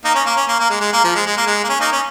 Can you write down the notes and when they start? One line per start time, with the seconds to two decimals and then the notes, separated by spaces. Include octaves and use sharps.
0.05 A#3 D#4
0.15 C#4
0.26 A#3
0.37 C#4
0.48 A#3
0.60 A#3
0.70 G#3
0.81 G#3
0.93 A#3
1.04 F3
1.15 G#3
1.26 G#3
1.37 A#3
1.47 G#3
1.64 A#3
1.69 C#4
1.81 A#3 D#4
1.92 C#4